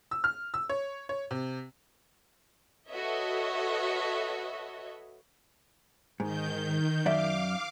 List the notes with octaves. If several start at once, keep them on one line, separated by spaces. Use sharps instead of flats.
E6
F6
E6
C#5
C#5
C3
F#4 A4 B4 C#5 D#5 E5
G#2 D#3 G6
F#2 D5 E5 F5 D6